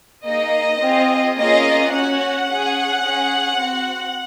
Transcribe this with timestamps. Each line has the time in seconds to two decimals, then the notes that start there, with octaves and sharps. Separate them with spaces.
0.24 A#3 D#4 G#4 D#5
0.80 C4 F4 G#4
1.35 A#3 C#4 F4 G#4 D#5
1.90 C#4 F#4 F#5
2.47 C#4 G#4
3.03 C#4 G#4
3.58 C4 F#4